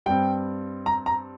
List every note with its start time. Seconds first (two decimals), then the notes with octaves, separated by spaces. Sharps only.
0.06 G2 G3 C4 G5
0.86 A#5
1.06 A#5